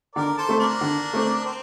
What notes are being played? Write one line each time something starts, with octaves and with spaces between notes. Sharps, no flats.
D3 A#4 D5
A4 C5
A3 C4
A#3 D4
D3
A3 C4
C4